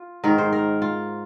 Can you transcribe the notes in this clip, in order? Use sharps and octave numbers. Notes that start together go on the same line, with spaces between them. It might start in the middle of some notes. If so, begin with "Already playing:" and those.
Already playing: F4
G#2 D#3 A#4
C5
A#4
F4